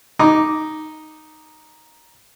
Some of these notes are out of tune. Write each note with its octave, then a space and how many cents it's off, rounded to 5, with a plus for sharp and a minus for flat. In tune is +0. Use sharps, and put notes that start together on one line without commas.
D#4 +0 D6 +0